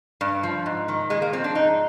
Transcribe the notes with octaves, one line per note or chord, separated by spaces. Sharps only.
G2
F3
G#2
D#3
A#2 G#3
A#3
F3 C4
D4
G#2 D#4